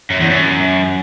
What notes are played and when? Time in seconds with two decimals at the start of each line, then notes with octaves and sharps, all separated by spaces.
0.11 F#2
0.20 E2
0.30 F#2